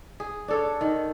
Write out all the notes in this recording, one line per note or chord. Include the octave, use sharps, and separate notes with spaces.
G#4
D4 A4 C#5
D#3